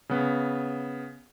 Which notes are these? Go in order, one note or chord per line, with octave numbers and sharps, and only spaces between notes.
C#3 B3